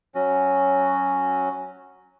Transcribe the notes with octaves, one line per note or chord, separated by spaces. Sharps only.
F#3 C#4 F#4